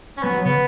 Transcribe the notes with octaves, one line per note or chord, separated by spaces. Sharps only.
C#4
F#3 B3
F#3
C#3 B3